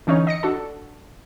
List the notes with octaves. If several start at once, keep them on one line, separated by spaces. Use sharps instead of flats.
D3 E3 C#4 D#4 C#5
D#5 A#6 C#7
D4 F#4 A4